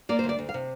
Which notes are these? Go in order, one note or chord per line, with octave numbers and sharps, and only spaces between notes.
A#3 D5
C5
D2
D5
D2
F5
C3